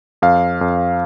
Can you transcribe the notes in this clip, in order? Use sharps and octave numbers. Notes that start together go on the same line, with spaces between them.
F2 F5
F2